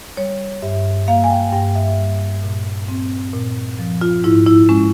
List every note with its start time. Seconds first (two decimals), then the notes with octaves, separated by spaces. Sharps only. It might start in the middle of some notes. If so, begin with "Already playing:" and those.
0.17 G3 C#5
0.62 G2 E5
1.08 A#3 F5
1.24 G#5
1.30 G5
1.53 G2 G5
1.75 E5
1.98 G3
2.43 A#2
2.88 C4
3.33 A#2
3.79 F3
4.01 F4
4.24 G#2 E4
4.46 E4
4.69 G#3 C#4